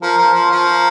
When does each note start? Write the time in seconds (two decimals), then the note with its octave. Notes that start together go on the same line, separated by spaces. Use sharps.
0.02 F3 A#4
0.18 F3
0.24 C5
0.34 F3
0.45 C#5
0.51 F3
0.67 A#5